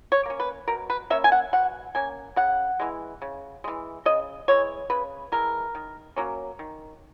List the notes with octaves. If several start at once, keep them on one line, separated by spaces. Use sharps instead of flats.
C#5
A#3 C#4
B4
B2 A#4
B4
A#3 C#4 E5
G#5
F#5
B2 F#5
A#3 C#4 G#5
C#3 F#5
E3 G#3
C#3
E3 G#3
C#3 D#5
E3 G#3 C#5
C#3 B4
E3 G#3 A#4
D#3
F#3 A#3 C#4
D#3